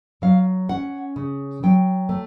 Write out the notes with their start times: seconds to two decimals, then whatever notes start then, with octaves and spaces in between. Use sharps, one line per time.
0.22 F#3 F5
0.69 C#4 F#5
1.16 C#3
1.63 F#3 G5
2.09 A3